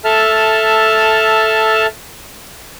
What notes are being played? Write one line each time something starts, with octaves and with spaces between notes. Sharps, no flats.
A4 E5 A5 F6